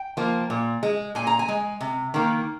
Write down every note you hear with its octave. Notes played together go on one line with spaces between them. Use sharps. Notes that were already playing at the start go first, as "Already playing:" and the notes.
Already playing: G5
F3 A#3
A#2
G#3
A#2 G#5
A#5
G#5
G#3
C3
D#3 A#3